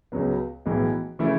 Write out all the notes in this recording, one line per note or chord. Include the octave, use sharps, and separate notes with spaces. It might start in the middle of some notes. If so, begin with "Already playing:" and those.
C#2 C#3 F#3 B3
B1 A2 E3 G#3 B3
C#3 E3 A3 E4